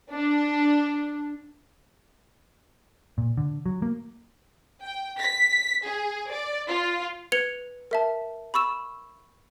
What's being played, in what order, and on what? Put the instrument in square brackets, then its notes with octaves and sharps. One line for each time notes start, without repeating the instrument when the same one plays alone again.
[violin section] D4
[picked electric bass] A#2
D3
F#3
A#3
[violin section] G5
B6
G#4
D5
F4
[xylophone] B4 G#6 C#7 F7 G7
A#4 E5 A5
B5 C#6 E6 E7